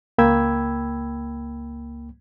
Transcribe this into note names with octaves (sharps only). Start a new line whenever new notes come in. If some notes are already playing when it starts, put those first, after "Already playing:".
C#2 A#3 G5 B5 E6 G#6